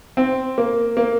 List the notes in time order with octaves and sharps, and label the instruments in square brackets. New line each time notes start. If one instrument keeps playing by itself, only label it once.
[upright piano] C4
A#3
A#3